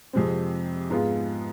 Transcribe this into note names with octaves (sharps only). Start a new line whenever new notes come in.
F2 C3 G#3 C4
G#2 G#3 B3 F4